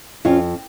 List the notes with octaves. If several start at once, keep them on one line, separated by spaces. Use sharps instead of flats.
F2 C#4 F4